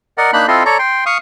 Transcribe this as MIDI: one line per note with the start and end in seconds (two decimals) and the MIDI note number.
0.18 0.31 70
0.18 0.31 74
0.18 0.31 75
0.18 0.31 78
0.33 0.47 58
0.33 0.47 62
0.33 0.47 63
0.33 0.47 83
0.33 0.47 90
0.48 0.63 60
0.48 0.63 64
0.48 0.63 65
0.48 0.63 69
0.48 0.63 75
0.48 0.63 84
0.65 0.78 69
0.65 0.78 73
0.65 0.78 74
0.65 0.78 82
0.79 1.04 79
0.79 1.04 84
1.06 1.18 77
1.06 1.18 85
1.06 1.18 87